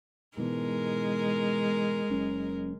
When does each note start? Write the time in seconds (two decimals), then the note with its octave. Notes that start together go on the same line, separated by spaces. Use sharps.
0.37 G#2 B2 E3 G#3 A#4
2.10 F#1 C#4